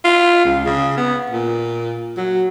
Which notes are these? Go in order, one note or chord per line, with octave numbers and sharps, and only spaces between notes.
F4
C#2
C#3
B3
A#2
F#3